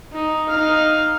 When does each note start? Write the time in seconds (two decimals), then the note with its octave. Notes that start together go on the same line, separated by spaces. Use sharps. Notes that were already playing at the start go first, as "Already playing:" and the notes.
0.13 D#4
0.49 D#4 F5